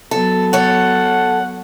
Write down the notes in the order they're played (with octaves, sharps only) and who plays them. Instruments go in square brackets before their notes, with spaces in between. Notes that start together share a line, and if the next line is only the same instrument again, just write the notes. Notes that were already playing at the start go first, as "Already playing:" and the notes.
[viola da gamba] F#3 B3 [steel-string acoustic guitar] A4
[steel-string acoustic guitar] A4 C#5 [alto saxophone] F#5